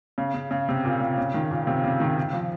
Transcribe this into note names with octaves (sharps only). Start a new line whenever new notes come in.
C#3
C#3
C#3
C3
A#2
C3
C#3
D#3
A#2
C3
C#3
D#3
F3